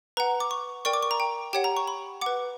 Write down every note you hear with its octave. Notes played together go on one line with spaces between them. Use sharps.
B4 F#5 A#5
D6
C#6
A#4 D5 G5 C#6
D6
C#6
A#5
G5
G4 C#5 F#5 G5
A#5
C#6
B5
B4 F#5 D6